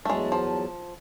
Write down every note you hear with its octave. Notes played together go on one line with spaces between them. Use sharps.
E2 F#3 G#3 A3 A5
F3